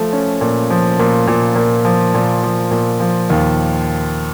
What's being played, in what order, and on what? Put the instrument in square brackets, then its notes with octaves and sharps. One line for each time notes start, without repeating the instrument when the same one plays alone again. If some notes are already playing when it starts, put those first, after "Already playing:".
Already playing: [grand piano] F3 A3
C#4
A#2
F3
A#2
A#2
A#2
F3
A#2
F3
A#2
F3
D#2